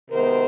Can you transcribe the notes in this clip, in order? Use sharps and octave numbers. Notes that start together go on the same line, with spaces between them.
C3 D#3 G#3 B3 A#4 C5